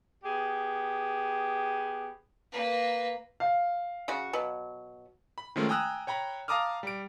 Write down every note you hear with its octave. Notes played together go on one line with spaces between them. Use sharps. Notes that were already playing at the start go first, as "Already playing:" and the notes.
B3 G4 G#4
A#3 B4
F5
C#3 F#4
B2 F#3
B5
D#3 F3 G#3 A3 C4 C#4
G5 G#5 A#5 D#6 E6 F#6
C#5 G5 A#5 B5
F5 A5 A#5 D6 D#6 F6
G3 D7